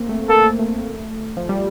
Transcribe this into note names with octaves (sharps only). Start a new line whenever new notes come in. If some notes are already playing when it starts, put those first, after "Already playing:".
Already playing: A#3 C4
A3
A#3 A4
A3
F3
G3